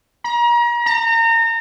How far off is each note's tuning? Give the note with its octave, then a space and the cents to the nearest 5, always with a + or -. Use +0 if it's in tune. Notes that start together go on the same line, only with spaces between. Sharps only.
A#5 +35
A#5 -30